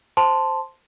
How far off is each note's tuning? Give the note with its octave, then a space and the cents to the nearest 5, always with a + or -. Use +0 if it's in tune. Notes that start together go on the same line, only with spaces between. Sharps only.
C5 +0 A5 +0 C6 +0